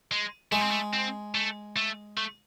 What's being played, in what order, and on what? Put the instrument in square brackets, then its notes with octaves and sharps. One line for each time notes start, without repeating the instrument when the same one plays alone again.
[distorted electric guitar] G#3
[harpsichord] G#3 [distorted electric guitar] A3
[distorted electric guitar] C4
A3
C4
A3
A3
A3